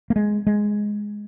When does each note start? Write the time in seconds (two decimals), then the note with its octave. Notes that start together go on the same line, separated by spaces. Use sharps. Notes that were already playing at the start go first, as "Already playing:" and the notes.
0.10 A#3
0.16 G#3
0.47 G#3